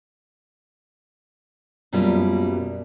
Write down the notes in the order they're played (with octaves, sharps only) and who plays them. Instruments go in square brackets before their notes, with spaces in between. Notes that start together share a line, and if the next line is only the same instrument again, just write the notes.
[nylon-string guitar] F#2 B2 G3 A#3 F4